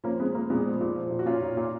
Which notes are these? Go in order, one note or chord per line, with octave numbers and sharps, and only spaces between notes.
F3 A#3 C#4
F3 G#3 B3
F3 A#3
A#2 G#3 B3
F3
A#2
F3
A#2
F#4
A#2 C#4 F4
A#2
A#2